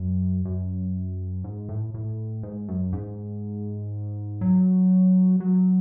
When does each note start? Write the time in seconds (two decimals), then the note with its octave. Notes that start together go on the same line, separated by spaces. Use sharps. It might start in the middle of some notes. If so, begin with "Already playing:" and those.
Already playing: F#2
0.45 F#2
1.44 G#2
1.69 A2
1.94 A2
2.43 G#2
2.68 F#2
2.93 G#2
4.41 F#3
5.40 F#3